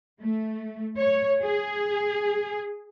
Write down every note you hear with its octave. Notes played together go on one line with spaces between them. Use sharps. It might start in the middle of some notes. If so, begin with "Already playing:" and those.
A3
C#5
G#4